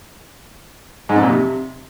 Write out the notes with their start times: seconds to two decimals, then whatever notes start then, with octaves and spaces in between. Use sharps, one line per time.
1.09 G#2
1.16 F2
1.23 A#2
1.29 C3